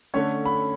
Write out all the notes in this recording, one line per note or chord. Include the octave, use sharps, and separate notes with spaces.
D3 A3 C#4 C#5
B5